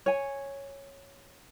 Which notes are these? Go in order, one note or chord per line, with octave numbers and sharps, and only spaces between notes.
C#5 G#5